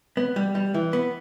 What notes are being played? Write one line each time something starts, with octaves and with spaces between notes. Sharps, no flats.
B3
G3
G3
E3
B3